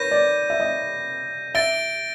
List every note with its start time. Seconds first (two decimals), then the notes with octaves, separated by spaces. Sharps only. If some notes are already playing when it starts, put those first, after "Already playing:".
Already playing: A#4 B4 C#5 G6 A#6 D#7
0.11 D5
0.50 E5
0.60 D#5
1.54 E5 A6 D7 G7